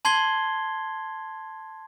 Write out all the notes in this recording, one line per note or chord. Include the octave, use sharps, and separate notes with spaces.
A5 C6 G#6 C7 G7